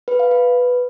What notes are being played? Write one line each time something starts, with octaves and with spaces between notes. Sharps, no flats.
B4
F5
B4